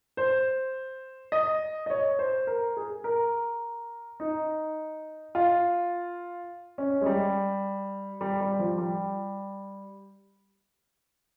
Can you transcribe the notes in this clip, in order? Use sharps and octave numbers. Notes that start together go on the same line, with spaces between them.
C5
D#5
D#5
C#5
C5
A#4
G#4
A#4
D#4
F4
C#4
G#3
G3
G3
G3
F3
G3